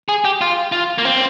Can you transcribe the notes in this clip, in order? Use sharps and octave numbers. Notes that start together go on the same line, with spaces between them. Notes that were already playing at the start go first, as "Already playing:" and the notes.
G#4
G4
F4
F4
A#3
C4